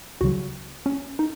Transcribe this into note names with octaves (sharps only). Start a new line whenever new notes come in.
C#2 C#3 F#3 F#4
C#4
D#4